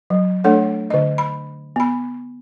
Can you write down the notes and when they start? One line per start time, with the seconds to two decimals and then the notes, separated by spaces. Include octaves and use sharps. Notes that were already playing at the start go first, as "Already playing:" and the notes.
0.10 F#3
0.44 A3 D4 A4 C#5 F#5
0.90 D3 D#5
1.18 B5
1.76 B3 B5